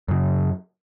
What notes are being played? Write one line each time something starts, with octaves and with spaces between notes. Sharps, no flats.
F#2 C#3